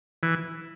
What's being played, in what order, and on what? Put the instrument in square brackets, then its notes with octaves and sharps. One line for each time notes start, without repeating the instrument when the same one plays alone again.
[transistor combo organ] E3